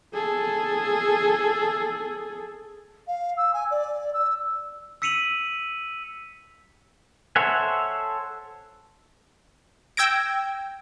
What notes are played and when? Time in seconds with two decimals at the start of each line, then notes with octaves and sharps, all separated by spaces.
0.14 G#4 A4
3.07 F5
3.37 E6
3.53 G#5
3.70 D5
4.13 E6
5.02 E6 B6 C#7 D#7 F7 F#7
7.36 A4 C5 C#5 E5 F#5 G#5
9.97 G5 E6 G#6 A#6 D7